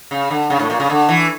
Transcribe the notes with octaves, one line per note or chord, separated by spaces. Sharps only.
C#3
D3
C#3
A2
A#2
C#3
D3
E3